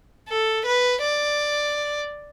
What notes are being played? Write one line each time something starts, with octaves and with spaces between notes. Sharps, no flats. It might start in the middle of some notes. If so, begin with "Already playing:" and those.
A4
B4
D5